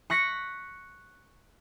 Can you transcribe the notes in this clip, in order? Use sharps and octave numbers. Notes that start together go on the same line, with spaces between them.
C#6 F#6 A#6 B6 C#7